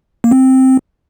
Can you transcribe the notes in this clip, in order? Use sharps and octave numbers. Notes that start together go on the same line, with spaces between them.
A#3
C4